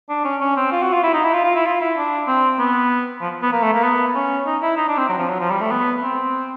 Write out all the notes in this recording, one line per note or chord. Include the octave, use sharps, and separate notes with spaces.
D4
C#4
C#4
C4
F4
F#4
F4
E4
D#4
E4
F4
F4
E4
F4
E4
D4
C4
B3
F3
B3
A#3
A3
A#3
B3
C#4
D#4
E4
D#4
D4
C4
F#3
F3
F#3
F3
G3
A3
B3
C4